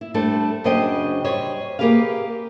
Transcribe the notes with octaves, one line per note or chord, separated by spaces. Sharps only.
E4
G3 A3 D4 A4 C5
F#2 C#3 D4 C5 D#5 G5
G3 C5 C#5 D#5
A#3 G4 G#4 B4 F5